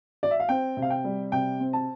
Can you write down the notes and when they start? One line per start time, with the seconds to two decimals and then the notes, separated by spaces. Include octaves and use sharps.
0.23 D5
0.31 E5
0.40 F5
0.49 C4 G5
0.77 C3
0.82 F5
0.90 G5
1.04 G3
1.32 C3 G5
1.60 C4
1.73 A5